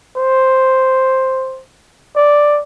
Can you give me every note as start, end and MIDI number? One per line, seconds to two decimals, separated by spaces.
0.16 1.62 72
2.16 2.61 74